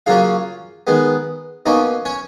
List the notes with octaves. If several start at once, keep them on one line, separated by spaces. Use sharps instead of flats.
C#3 F#3 A#3 C#4 F4 F5
D#3 G#3 B3
B2 A#3 C#4 D#4 D#5
C#4 C#5